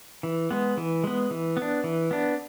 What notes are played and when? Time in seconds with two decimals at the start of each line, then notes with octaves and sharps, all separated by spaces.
0.23 E3
0.51 G#3 B3
0.77 E3
1.04 G#3 B3
1.31 E3
1.57 B3
1.62 D4
1.84 E3
2.11 B3 D4